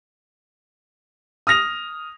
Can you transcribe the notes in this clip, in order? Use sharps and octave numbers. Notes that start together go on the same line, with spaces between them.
D#6 F6 A#6 F7